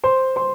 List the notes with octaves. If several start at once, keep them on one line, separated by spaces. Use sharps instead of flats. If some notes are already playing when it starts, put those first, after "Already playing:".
C5 C6
C5 C6